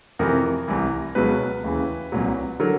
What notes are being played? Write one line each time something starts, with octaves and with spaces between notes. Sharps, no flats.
F2 C3 E3 A#4
C2 C3 E3
C#2 B2 F#3 B4
D#2 C#3 E3
C2 A#2 F#3
D3 F#3 A#4